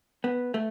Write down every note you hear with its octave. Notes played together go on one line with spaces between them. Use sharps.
B3
A3